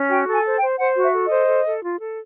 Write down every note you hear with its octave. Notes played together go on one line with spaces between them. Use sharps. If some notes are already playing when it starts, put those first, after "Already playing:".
Already playing: C#4
F#4 G5
A4
G#5
C5
G5
C5
C5 F#5
F#4
E5
A4
D#5
C5
A4
A4
F4
A4